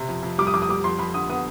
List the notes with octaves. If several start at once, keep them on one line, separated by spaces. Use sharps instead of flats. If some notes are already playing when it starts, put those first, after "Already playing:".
Already playing: C3
F2
F2
G3 D6
D#6
F2 D6
D#6
G3 D6
F2 C6
F2 B5
D3 D#6
B3 D#6